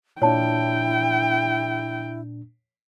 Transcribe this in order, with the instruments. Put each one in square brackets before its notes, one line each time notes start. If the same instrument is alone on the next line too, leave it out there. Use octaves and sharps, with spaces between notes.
[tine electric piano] A#2 D4 [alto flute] E4 [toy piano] C#5 A5 [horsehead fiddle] G5